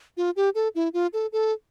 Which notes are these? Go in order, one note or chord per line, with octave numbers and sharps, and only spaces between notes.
F4
G4
A4
E4
F4
A4
A4